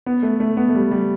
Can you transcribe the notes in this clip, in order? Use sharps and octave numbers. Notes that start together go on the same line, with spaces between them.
B3
A3
A3
B3
A3
G3
G3